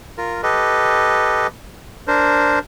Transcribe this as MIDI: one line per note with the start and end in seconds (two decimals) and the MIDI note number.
0.18 0.41 65
0.18 0.41 70
0.43 1.47 67
0.43 1.47 69
0.43 1.47 71
0.43 1.47 75
2.07 2.59 62
2.07 2.59 70
2.07 2.59 72